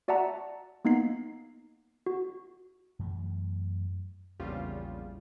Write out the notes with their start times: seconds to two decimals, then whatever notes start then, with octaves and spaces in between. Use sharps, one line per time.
0.08 F#4 D5 E5 F#5 A5 A#5
0.85 A#3 B3 D#4 G#6 C7
2.06 F#4
2.99 F#2 E3 A3
4.40 A#1 E2 C#3 G3 F4